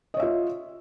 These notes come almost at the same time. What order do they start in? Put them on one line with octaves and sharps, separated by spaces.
D#5 C#5 E5 F4